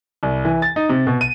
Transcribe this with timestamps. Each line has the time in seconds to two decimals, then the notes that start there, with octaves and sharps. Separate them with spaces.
0.23 C2
0.45 E3
0.62 A6
0.76 D#4
0.89 C3
1.07 B2
1.21 D#7